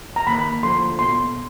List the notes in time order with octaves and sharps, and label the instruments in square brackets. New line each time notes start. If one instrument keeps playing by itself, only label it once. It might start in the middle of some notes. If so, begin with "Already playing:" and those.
[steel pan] A#5
[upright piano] D#2 [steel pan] B5
[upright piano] D3 F3 A3 [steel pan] C6
[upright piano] B2 [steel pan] C6